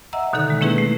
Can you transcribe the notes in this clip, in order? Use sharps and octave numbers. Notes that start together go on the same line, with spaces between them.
D#5 E5 F#5 A#5 E6
B2 D3 D#3 D#4 A4 E5
D3 G#3
A#3 C#4 E4 G#4 B4
A3